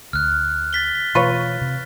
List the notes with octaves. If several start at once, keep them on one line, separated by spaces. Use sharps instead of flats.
D2 F6 F#6
A6 B6 G7
B2 E3 A3 F4 B4 C#5
C3